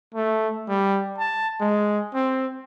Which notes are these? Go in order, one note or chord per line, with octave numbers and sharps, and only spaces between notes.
A3
G3
A5
G#3
C4